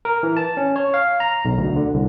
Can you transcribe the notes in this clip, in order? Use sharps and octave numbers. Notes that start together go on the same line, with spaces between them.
A#4
E3
A5
C#4
C#5
F5
A#5
B1
D2
D3
C2